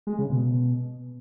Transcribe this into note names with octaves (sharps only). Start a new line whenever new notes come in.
G#3
C#3
B2